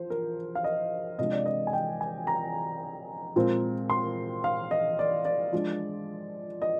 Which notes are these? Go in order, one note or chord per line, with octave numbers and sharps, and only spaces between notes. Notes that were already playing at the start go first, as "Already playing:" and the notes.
Already playing: F3 C5
A#4
F5
D#5
C3 F3 G#3 D4 D#5
D5
D#5
G#5
G5
G#5
A#5
A#2 F3 G#3 C4
C6
F5
D#5
D5
D5
F3 G#3 D4
D#5